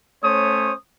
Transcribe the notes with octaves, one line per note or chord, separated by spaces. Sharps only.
A3 C#4 C5 C#5 D#6